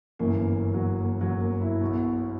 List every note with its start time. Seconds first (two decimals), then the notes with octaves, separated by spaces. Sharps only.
0.19 G1 F#2 E3 A#3
0.74 F#3
1.01 A#3
1.21 F#3
1.41 A#3
1.61 E4
1.81 B1 B2